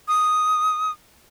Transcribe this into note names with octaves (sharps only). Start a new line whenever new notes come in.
D#6